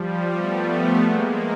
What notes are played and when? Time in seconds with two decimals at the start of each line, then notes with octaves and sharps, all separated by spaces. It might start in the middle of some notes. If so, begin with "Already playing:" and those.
Already playing: F3 G3
0.34 A3 B3
0.98 G#3 A#3